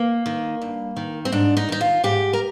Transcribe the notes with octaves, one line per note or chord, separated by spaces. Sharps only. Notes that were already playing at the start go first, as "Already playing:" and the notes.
Already playing: A#3
D#3
G2
D#3
C4
G#2 D4
D#4
D#3 D#4
F4
G#2 G4
A#4